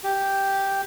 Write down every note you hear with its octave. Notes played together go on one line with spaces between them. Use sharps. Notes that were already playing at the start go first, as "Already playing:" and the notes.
G4